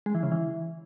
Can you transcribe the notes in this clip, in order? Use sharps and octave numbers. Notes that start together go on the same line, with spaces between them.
G#3
E3
C#3
E3